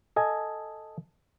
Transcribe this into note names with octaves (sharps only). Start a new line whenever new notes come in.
A4 D#5 G#5